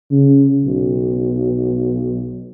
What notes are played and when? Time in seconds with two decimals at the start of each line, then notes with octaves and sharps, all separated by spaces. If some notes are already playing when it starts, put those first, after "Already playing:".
0.11 C#3
0.65 B1